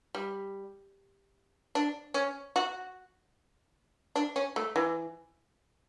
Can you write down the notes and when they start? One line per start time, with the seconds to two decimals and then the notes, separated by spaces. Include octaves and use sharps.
0.15 G3
1.75 D4
2.14 C#4
2.56 F#4
4.16 D4
4.36 C#4
4.56 A3
4.76 E3